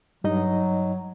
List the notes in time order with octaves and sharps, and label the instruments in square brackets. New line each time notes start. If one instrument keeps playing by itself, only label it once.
[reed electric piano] G2 D#4 D#5 [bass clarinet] F#3